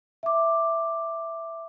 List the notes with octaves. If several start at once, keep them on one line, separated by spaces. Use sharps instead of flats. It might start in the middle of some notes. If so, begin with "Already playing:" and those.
E5 D6